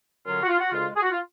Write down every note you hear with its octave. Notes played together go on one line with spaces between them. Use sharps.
F#2 D3 F#3 C#4 F4
F#4
F4
F#4
D2 C#3 G#3 F4
G#4
F#4
F4